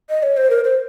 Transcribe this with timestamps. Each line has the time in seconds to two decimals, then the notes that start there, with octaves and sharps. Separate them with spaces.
0.10 D#5
0.23 C#5
0.37 C5
0.50 A#4
0.64 C5